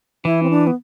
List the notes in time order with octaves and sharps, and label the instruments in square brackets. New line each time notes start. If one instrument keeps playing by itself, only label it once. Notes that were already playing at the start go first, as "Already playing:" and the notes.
[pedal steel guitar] E3 [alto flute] E4
[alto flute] C4
D4
B3